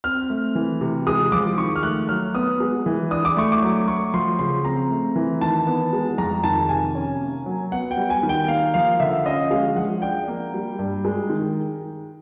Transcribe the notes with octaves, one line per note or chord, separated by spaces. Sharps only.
C4 F6
A3
E3
C3
G#3 D#6
F3 D6
D#3 C#6
F6
A3 F#6
F#3 F6
B3 D#6
G#3
E3
D4 D#6
D6
A3 C#6
D6
F#3
A3 C#6
F3 C6
C#3 C6
C4 A#5
A3
E3
D#3 A5
B3
G#3
F2 A#5
D#3 A5
C3 G#5
C#4
A#3
F#3
B3 F#5
G5
G3
G#5
D#3
G5
A#3 F5
F3 F5
D3 E5
C#4 D#5
G#3 F5
F3 F#5
D4 G5
A#3
G3
G2
G#3
D#3